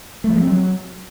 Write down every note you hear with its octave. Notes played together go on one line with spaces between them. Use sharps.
A3
F3
G#3
C4
F#3